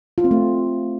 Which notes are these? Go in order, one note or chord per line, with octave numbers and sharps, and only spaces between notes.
F4
C4
A3